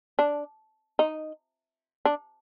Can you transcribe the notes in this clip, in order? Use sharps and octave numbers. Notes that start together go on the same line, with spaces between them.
D4
D#4
D4